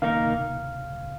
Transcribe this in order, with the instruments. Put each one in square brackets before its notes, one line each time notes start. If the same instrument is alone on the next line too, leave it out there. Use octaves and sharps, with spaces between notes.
[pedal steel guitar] D#3 A#3 D#4 A#4 [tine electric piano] F5